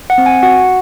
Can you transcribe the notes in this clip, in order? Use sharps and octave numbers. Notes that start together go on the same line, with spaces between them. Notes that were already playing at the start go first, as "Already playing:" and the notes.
F#5
C4
G#5
F#4 F#5